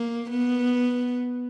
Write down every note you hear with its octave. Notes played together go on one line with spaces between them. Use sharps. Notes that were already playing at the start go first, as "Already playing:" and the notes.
Already playing: A#3
B3